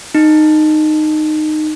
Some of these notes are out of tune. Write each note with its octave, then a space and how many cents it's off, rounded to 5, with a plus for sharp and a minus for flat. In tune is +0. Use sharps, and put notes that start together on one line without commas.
D#4 -15